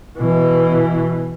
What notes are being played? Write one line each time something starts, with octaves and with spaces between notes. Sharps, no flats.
B2 E3